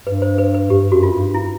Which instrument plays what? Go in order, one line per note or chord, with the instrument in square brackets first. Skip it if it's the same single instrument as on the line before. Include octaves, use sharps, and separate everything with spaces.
[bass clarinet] G2 [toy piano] B4
[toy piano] C5
B4
B4
[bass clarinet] G2 [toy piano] G4
[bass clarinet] F#2 [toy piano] F#4
[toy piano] F4
[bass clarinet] G2
[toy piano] E4